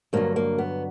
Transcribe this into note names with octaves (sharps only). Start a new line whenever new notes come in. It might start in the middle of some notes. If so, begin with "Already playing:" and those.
G2 D3 F#3 A#3
A#3
B3